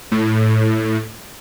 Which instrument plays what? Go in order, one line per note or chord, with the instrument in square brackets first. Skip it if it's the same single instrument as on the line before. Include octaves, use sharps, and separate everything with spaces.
[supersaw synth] A2